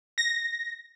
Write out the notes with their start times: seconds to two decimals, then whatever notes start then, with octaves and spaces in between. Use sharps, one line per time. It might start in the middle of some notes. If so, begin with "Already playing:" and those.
0.18 A#6